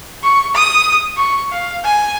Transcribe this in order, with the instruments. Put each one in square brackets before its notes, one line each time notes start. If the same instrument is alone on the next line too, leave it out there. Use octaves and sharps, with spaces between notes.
[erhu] C#6
D#6
C#6
F5
G#5